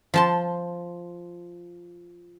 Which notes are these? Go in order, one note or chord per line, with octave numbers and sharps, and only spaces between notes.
F3 A5 C6